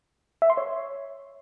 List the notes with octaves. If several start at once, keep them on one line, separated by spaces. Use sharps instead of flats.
E5
C6
C#5